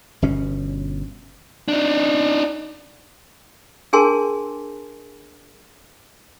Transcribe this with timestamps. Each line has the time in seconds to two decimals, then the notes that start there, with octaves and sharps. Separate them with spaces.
0.22 G1 B2 C#4
1.68 D4 D#4
3.93 D4 G#4 A#4 G#5 A5 C6